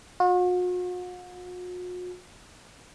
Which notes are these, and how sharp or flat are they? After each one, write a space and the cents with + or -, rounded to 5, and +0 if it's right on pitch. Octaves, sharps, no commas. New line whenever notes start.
F#4 -45